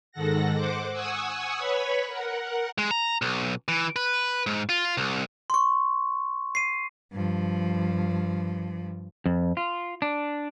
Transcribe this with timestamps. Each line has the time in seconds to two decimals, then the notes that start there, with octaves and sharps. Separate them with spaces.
0.12 G#2 D#3 A4 F#5 A#6
0.55 C5 F#5 D6
0.92 F#5 G#5 C#6 D#6 E6
1.58 B4 C#5 B5 C#6
2.07 A#4 F#5
2.78 G#3
2.91 A#5
3.22 B1
3.68 E3
3.96 B4
4.47 G#2
4.69 F4
4.97 C2
5.50 C6 C#6
6.55 C7 D#7
7.13 G2 F3
9.26 F2
9.57 F4
10.02 D4